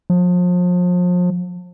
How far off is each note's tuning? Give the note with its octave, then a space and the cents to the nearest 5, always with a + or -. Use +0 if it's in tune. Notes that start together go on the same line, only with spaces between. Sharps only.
F3 +35